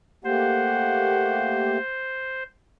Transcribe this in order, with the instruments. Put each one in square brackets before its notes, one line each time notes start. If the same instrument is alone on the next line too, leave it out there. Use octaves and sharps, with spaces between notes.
[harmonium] A3 A#3 G4 [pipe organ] C5 [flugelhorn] F#5